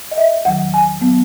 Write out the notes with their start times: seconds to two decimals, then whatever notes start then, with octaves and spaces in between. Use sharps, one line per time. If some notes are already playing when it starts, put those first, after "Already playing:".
0.11 D#5
0.18 E5
0.45 E2 D#3 F#3 F#5
0.74 G#5
1.01 F#3 B3